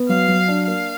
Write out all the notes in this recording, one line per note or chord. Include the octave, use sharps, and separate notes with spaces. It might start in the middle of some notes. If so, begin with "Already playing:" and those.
Already playing: B3
F#3 F5
F#3
D4
A#3 F5